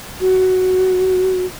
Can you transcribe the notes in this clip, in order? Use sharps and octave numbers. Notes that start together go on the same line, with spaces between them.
F#4